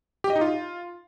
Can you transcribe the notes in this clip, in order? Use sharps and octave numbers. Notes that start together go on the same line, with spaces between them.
G4
D#5
D#4
F4